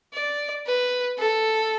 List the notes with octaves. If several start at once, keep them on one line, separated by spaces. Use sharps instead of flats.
D5
B4
A4